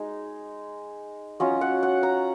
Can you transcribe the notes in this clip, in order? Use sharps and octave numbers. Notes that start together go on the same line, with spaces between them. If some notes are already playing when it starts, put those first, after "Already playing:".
Already playing: G#3 D#4
F#3 C#4 F4 D#5
F#5
F#5
A#5